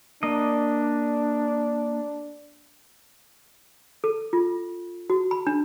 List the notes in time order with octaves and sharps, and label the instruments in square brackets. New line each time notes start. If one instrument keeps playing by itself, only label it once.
[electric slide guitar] A#3 D#5 [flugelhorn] D4
[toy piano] A4
F4
F#4
B5
D4